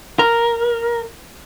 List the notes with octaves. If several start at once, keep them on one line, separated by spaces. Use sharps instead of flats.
A#4